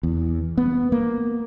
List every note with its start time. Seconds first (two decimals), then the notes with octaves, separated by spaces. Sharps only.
0.03 E2
0.58 B3
0.92 A#3